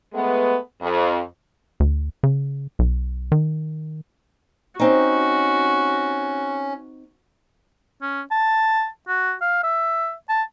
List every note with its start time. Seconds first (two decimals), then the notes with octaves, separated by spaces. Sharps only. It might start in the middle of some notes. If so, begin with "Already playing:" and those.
0.12 G#3 A3 B3
0.81 F2
1.80 D2
2.23 C#3
2.79 B1
3.32 D#3
4.80 C4 C#4 D#4 F#4
8.02 C#4
8.31 A5
9.08 F#4
9.42 F5
9.63 E5
10.29 A5